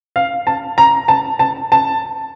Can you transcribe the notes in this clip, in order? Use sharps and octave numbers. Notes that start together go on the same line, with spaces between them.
F5
A5
A#5
A5
A5
A5